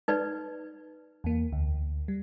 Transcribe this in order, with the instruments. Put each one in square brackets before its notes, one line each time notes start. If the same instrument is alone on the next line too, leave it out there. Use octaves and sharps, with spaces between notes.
[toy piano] D#4 B4 D5
[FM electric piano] E2 A#3
D2
G3